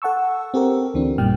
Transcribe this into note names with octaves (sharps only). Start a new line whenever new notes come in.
A4 F#5 A5 C#6 E6
C4 G4 A4 A#4
D2 E3 C4 D4
A1 F#2 A#2 G3 G5 F6